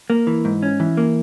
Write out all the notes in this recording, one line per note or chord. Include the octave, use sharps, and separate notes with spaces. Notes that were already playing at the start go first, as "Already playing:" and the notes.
A#3
E3
G#2
C#4
E3
A#3